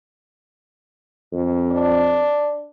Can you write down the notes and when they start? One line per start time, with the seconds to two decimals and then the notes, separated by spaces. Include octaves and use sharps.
1.32 F2
1.71 D4